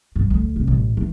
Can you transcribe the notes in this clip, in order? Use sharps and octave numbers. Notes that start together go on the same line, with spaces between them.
G2
D2
C3
A1
E3